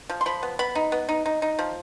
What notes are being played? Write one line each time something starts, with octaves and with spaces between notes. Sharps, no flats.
F3
C6
F3 B5
B3
B3 B5
D#4
B3
D#4
D#4
D#4
F3